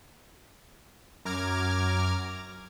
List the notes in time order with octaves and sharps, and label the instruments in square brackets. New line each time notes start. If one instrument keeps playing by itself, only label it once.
[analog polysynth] F#2 A#5 D6 F6 G#6